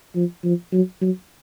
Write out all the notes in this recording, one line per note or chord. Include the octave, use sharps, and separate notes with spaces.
F3
F3
F#3
F#3